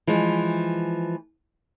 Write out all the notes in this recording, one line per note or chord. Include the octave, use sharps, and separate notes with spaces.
E3 F3 G#3